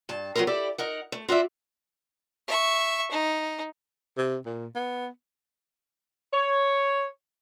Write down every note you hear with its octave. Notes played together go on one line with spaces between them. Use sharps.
G2 A5
F#3 B3 C4 F4 A#4
E4 G4 A4 D5
D#4 A#4 F#5
A3
F4 F#4 D5 E5
E5 C#6
D#4
C3
A#2
B3
C#5